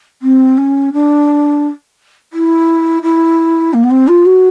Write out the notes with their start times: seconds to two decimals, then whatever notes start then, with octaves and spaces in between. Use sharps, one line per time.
0.22 C4
0.58 C#4
0.93 D4
2.33 E4
3.03 E4
3.74 A#3
3.84 B3
3.90 C4
4.08 F4
4.26 F#4